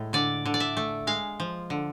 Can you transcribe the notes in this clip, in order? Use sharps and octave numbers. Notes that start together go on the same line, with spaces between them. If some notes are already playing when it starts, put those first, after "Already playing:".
Already playing: A2 G#3
D3 D5
D3
D5
E5
A3
G#3 F5
F3
D3